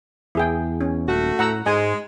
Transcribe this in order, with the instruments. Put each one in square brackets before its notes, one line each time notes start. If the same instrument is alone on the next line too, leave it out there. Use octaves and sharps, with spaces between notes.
[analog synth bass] E2 [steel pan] E4 G#4 G5
[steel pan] C#4
[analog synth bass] D#1 [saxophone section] A3 F#4
[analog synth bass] A2 [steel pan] F#5 A#5 E6
[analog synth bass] G#2 [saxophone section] G#3 [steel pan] G#5